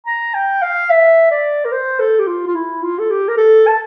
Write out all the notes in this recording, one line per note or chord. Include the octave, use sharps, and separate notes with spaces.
A#5
G5
F5
E5
D5
A#4
C5
A4
G4
F4
F4
E4
F4
A4
G4
A#4
A4
A5